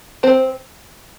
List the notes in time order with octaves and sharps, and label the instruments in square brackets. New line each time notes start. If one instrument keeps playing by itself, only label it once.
[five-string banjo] C4 C5